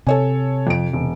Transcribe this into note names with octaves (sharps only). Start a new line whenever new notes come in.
C3 A4 C#5 G#5
F2 D7
E1